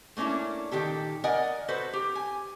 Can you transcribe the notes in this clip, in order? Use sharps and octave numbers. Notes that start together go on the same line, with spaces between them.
A3 A#3 C#4 D4 E4
A#2 D#3 G4 A4
A#4 D5 D#5 F#5 G#5
F#4 A4 B4 C5
G4
G#5